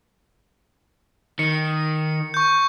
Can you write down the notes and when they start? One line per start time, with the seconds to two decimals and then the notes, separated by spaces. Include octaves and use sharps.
1.39 D#3 C#7
2.34 C#6 G6